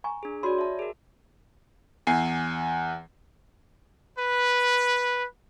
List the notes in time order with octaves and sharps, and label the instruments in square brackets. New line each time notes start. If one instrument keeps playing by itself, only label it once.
[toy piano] G#5 A#5 C#6
[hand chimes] D4 G#4
[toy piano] F#4 B5 C6 [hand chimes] C#5 D5
[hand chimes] E5 A5
G#4 A#4
[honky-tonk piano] E2 G#5 C7
[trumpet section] B4